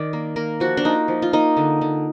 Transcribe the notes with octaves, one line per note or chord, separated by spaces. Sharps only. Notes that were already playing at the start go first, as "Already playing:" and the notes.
Already playing: D#3 D5
A#3
A#3 A#4
F3 F#4
D4
A#3 D#4
F3
F4
A#3 D#4
D3
D3